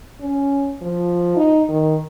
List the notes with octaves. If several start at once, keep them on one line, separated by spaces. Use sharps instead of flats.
C#4
F3
D#4
D#3